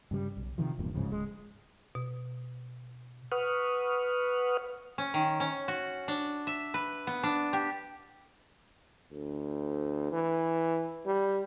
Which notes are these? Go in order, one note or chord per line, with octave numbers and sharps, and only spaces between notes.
G2 C#3 G3
B1
C3 D#3 F3
F1 E2 G2 A#2
D1 G#2 C#3 F3
D1 G#3
B2
B4 F#5 C#6 D#6 F6
C#4
D#3
C#4
F#4
D4
E5
B4
B3
D4
G4
D2
E3
G3